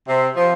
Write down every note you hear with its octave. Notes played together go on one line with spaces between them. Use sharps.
C3
F3